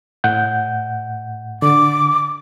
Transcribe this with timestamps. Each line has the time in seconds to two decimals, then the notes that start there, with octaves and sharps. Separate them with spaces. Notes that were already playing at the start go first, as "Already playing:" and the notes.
0.24 A2 F#5 G6
1.62 D3 D6